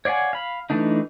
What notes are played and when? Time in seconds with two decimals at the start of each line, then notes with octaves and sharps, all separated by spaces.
0.05 C#5 D5 F5 F#5 G#5
0.33 F5 B5
0.70 E3 A3 D4 D#4